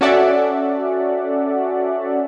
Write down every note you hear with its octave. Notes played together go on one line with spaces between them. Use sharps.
C#4 F#4 A4 D5 E5 F#5